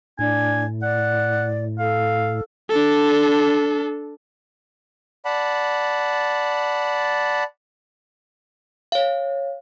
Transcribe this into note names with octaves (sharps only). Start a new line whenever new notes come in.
A2 D4 G#5
D5 F#5
A4 F5
D4 A4
D5 F#5 A5 B5
C#5 F5